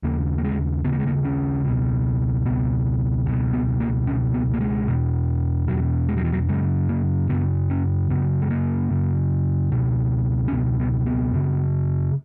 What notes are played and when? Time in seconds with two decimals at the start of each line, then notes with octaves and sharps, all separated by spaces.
0.03 D#2 C#3 A#3
0.38 A#3
0.44 G#3
0.85 D#2 C#3 B3
0.92 A#3
1.00 G#3
1.07 A#3
1.25 C#4
1.65 C#2 B2
2.45 C#2 B2 B3
3.26 C#2 B2
3.53 B3
3.80 A#3
4.07 C#2 C#4
4.11 B2
4.34 B3
4.54 A#3
4.60 G#3
4.88 E2 B2
5.68 E2 B2 F#3
6.09 G#3
6.17 F#3
6.25 E3
6.32 F#3
6.49 F#2 C#3 G#3
6.89 A#3
7.29 F#2 C#3 B3
7.70 C#4
8.10 F#2 C#3 B3
8.42 G#3
8.50 A#3
8.91 F#2 C#3
9.72 C#2 B2
10.48 C#4
10.52 C#2 B2 B3
10.80 B3
11.06 B3
11.33 F#2 C#3